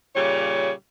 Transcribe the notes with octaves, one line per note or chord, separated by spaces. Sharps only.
A#2 C#3 G3 C#5